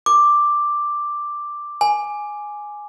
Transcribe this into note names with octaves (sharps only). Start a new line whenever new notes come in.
D6
G#5